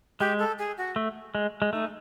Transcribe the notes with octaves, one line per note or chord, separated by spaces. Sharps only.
G#3 G4
A4
G#4
F#4
A3
G#3
G#3
A3 D#4